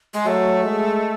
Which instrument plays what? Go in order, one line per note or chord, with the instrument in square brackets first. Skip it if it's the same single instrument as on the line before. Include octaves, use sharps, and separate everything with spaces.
[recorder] G#3
[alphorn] F#3 [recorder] A3
[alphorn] G#3